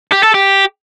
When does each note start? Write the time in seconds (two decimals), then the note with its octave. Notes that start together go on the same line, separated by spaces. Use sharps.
0.12 G4
0.23 A4
0.34 G4